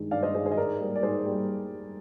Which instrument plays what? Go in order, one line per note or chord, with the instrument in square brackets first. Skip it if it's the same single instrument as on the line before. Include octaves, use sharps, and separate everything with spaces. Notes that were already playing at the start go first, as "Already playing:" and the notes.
Already playing: [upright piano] G2 D#3 G#3
G2 D5 F5
C5 D#5
D#3 G#3 G#4 C5
G#4 C5
D#5
G#2 A#4 D5
G3 A#3
D5
G#2 G#4 C5
G3 A#3